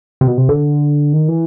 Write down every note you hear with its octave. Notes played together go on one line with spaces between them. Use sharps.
C3
B2
C3
D3
D#3
E3